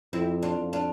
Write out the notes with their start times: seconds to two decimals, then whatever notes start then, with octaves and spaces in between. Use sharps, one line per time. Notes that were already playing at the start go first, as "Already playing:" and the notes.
0.13 F2 C4 E4
0.43 D4 F4
0.58 F2
0.73 D4 F4